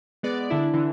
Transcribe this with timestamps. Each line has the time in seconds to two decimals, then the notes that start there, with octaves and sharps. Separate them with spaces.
0.23 G#3 B3 D5
0.50 D3 D4 E4
0.74 D3 E3